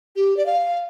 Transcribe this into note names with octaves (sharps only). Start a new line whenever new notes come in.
G4
D5
F5